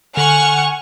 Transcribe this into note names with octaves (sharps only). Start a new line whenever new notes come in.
D3 F#5 G#5 C#6 F6